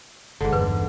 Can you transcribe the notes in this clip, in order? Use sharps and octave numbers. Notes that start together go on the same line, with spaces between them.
G1 G#2 D3
G1 E2 G2 B4